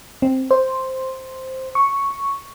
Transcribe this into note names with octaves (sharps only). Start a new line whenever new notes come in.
C4
C5
C#6